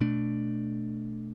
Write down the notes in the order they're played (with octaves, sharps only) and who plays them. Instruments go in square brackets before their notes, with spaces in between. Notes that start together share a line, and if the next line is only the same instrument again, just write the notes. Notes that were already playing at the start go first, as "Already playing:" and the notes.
[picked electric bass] B2 A3 D4